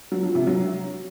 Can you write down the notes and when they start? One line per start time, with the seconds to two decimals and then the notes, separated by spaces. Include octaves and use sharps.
0.12 F#3
0.23 F3
0.35 C3
0.47 F#3